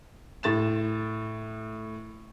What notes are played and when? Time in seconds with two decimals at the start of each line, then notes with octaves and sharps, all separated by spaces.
0.43 A2 A6 E7